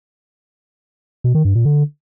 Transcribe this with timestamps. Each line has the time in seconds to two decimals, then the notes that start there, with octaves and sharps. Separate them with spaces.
1.24 B2
1.35 D#3
1.45 G2
1.55 A#2
1.65 D3